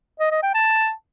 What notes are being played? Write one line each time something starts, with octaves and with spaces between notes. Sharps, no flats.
D#5
D#5
G5
A5